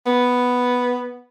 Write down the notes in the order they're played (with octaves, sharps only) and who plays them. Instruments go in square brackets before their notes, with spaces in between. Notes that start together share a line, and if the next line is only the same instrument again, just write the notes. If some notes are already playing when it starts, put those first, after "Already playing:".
[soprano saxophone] B3